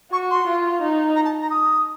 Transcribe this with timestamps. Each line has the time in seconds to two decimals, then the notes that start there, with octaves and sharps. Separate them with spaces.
0.12 F#4 C#6
0.31 C6
0.48 F4
0.82 D#4
1.16 A#5
1.25 A5
1.42 A#5
1.51 D#6